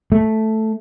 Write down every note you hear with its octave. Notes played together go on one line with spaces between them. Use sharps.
A3